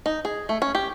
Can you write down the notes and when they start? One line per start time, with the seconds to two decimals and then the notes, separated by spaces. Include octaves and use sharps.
0.06 D#4
0.25 G#4
0.49 A3
0.62 C#4
0.75 G4